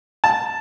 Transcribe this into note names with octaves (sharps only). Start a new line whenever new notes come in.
A5